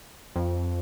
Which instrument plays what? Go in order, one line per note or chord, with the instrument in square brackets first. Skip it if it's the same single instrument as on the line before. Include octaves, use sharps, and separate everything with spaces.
[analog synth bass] F2